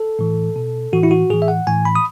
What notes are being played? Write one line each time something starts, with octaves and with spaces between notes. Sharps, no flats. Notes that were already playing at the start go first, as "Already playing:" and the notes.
Already playing: A4
A2 E3
B2
A2 E3 F#4
E4
F#4
A2 E3 G#4
E5
F#5
A2 E3 G#5
B5
D#6